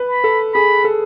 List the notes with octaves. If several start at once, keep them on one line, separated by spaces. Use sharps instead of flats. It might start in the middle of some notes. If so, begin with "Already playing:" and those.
Already playing: B4
B5
A4
G#4 B5
A4